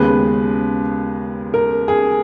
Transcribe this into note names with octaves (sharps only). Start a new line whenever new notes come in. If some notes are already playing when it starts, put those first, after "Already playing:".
Already playing: D#2 C#3 G#3 B3 B4
A#4
G#4